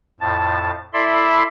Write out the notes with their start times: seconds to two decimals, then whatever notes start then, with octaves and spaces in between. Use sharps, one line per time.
0.20 F2 A2 A5
0.93 E4 A4 D5 E5 B5 C6